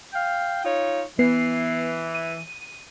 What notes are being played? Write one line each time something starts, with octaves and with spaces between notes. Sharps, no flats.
F5 G5
D#4 F4 C#5
E3 B3 B4 C7
D#7